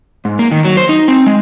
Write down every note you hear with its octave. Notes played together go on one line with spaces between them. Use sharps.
G#2
A#3
D#3
F#3
C5
D#4
C4
G#3